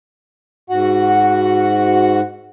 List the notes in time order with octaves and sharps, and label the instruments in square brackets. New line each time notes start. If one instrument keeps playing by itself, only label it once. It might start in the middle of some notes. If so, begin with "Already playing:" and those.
[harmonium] G#2 F#4 F#5